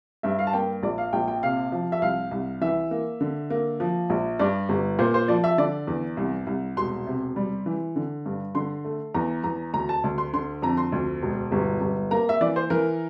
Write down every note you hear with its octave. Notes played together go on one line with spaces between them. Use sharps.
G2 E5
F5
A5
A#3 G5
A#1 D5
F5
A#1 G5
G5
C3 F5
F3
E5
C2 F5
C2
E3 E5
A#3
D3
A#3
F3
A#1
G2 D5
G1
A#2 C5
C5
F3 D5
E5
D3 D5
E2
C2
C2
E1 C6
C3
G3
E3
D3
G2
D3 C6
A3
E2 A#5
E2 A#5
D2 A#5
A5
D2
C6
D3 C6
F2 A#5
C6
D2
E1
G1
G1
A#3 A#5
E5
E3 D5
C5
E3 A#4